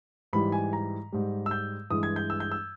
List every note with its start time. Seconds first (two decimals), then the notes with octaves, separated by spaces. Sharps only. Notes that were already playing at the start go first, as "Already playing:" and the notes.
0.33 G#2 E3 G3 B5
0.52 G#5
0.73 A#5
1.12 G#2 G3
1.46 E6
1.51 G6
1.90 G2 E3 G#3 D#6
2.03 G#6
2.16 G6
2.30 E6
2.40 G6
2.52 E6